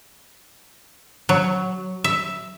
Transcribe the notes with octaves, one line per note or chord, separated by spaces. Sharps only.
F#3
E5